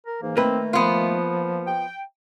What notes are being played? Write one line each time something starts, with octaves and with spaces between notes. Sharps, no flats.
A#4
G#2 E3 A#3
D#3 A3 A#3 C4 B4
F3 B3 F4
G5